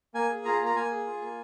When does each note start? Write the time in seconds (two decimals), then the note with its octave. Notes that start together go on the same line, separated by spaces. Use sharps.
0.14 A#3 G#5
0.30 G#4
0.45 F4 A#5
0.60 A#3
0.66 A#5
0.75 A#3 G#5
0.91 G#4
1.06 F4
1.21 A#3